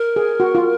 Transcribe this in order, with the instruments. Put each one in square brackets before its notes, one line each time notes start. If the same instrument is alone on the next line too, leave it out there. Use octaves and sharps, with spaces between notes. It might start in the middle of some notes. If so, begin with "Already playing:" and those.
Already playing: [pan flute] A#4
[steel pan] G#4
F#4
F4